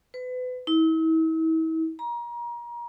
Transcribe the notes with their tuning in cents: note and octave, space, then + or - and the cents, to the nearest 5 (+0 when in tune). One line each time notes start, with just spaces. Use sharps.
B4 +35
E4 -40
A#5 +30